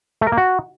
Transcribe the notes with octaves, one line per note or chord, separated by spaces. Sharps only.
A3
A#4
A#3
F#4